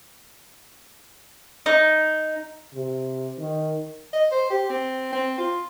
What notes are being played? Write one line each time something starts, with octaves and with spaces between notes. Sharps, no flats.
D#4
C3
D#3
D#5
C5
G4
C4
C4
F4